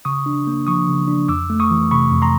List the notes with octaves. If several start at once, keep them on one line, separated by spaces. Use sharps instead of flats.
C#3 C#6 D#6
D4
A#3
F3 C#6 D#6
C#3
D4
F2 D6 E6
A3
C#6 D#6
E3
C3 B5 C#6
F2
A#5 C6